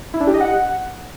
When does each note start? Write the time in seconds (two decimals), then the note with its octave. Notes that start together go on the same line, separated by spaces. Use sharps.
0.14 E4
0.20 D4
0.27 G4
0.34 D#5
0.41 F#5